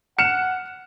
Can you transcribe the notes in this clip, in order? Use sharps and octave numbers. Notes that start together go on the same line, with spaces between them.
F#5 F6 C#7 E7